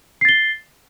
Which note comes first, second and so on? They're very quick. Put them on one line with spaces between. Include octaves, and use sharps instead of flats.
C7 A6 G7